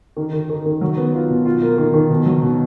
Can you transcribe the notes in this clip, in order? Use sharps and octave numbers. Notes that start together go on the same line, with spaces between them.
D#3
D#3
D#3
D#3
F#3
B3
F4
B2
F4
A#3
D#3
D#3
B2
F#3
B2